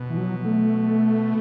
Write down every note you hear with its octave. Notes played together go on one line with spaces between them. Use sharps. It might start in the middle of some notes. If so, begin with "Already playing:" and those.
Already playing: B2
E3
F#3
A3